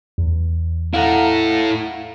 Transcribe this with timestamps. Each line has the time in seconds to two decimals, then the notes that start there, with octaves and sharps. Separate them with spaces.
0.18 E2
0.94 E4 A4 F5 F#5 A#5